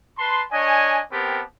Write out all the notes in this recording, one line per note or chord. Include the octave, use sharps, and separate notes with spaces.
B4 A5 C6
D4 C#5 D#5 G#5
B3 C4 G4 A#4 A5